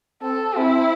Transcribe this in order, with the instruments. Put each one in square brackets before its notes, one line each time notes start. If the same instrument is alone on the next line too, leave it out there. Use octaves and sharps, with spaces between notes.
[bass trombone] C4 [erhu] A4
[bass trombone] C4 [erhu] E4